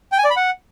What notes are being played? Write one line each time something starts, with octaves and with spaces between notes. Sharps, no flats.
G5
G#5
D5
B5
F#5